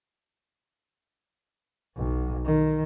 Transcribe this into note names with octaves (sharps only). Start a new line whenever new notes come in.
B1
D#3